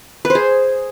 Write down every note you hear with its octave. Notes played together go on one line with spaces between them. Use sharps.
B4
C5
G#4